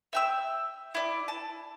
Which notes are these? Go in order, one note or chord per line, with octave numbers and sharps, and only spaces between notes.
E5 G5 E6
E4 D5
A5